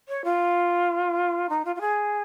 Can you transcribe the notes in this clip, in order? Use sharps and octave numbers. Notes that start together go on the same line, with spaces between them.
C#5
F4
D#4
F4
F4
G#4